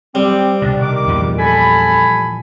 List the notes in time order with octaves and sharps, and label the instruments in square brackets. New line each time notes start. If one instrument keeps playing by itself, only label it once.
[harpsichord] G3 [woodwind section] C4 D6
[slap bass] C2 B2 [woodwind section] D4
[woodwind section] D#3 D6
[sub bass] E2 [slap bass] A#2 E3 F3
[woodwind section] A4 G#5 B5